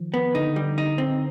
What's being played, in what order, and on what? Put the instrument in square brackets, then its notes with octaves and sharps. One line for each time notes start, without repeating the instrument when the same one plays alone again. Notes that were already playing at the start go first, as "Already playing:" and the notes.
Already playing: [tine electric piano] D#3 F3
[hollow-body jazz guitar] B3
[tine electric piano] D3 [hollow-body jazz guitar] D#4
[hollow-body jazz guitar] G3
D#4
C4